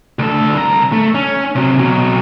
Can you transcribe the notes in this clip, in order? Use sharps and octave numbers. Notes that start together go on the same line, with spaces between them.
D2 A4
C2 A#5
A3
C#4
C3 F#3
B2 F#3